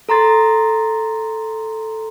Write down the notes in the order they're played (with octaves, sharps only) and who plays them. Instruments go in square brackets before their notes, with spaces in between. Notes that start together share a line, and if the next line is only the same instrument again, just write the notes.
[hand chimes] A4 A#5 C6 A6